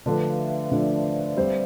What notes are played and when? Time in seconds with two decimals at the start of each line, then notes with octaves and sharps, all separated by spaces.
0.06 D3 F3 A3 D4 B4
0.28 F5
0.39 E5
0.71 D3 F3 A3 D4 D5
1.04 C5
1.37 G3 C4 G4 C5